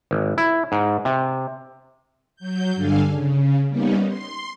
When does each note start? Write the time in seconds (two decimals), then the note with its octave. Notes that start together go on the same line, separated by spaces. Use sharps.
0.11 G#1
0.38 E4
0.72 G#2
1.05 C3
2.36 F#3 G6
2.75 G2 D3 D4 A4 F5 G#5
3.09 C#3
3.68 G3 A#3 B3 C#4 D#4
4.07 C6